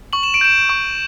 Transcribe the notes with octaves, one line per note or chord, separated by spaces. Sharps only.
C#6 F#7
E7
D7
G6 E7
C#6